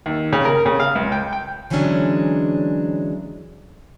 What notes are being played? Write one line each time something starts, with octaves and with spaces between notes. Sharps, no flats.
D#2
C#3
A#4
C#3
F5
C#2
G5
G5
D3 E3 F#3 G#3 C#4 D4